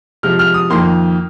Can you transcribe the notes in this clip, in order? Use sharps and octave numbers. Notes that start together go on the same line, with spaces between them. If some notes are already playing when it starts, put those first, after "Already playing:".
C3 F3 G#3 F6
F6
D#6
F2 D#3 A#3 C6